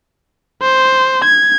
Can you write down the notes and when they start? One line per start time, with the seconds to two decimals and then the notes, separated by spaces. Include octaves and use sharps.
0.62 C5
1.25 G#6